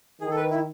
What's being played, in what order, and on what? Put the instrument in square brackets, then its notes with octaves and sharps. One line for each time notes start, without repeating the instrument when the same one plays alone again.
[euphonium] D#3 [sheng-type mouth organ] G#4
[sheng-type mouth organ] A4
B4
E4